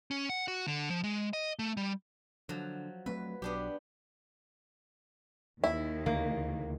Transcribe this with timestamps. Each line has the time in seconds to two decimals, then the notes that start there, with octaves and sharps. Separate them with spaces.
0.11 C#4
0.29 F#5
0.48 F#4
0.68 D3
0.90 F3
1.04 G#3
1.33 D#5
1.59 A3
1.77 G3
2.49 D3 F3 F#3
3.06 F#3 A3 C4 B4
3.42 B1 F#3 B3 D4 G4
5.64 D#2 D#3 E4
6.06 D2 C#3 E3 A#3